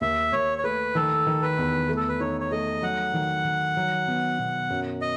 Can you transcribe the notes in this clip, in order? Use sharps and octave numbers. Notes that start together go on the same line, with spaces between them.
D#2 E5
D#2 C#5
C#5
A3 B4
D#3 A4
D#3
B4
E2
A3
A4
B4
D#4 C#5
C#5
A3 D#5
F#3 F#5
D#3
D#3
F#3
B3
B2
F#2
D#5